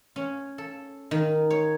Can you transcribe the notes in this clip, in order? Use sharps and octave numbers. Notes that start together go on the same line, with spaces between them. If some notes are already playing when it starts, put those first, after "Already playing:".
C#4
A4
D#3
C#5